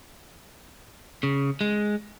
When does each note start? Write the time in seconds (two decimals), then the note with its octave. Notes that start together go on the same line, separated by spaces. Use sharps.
1.23 C#3
1.61 G#3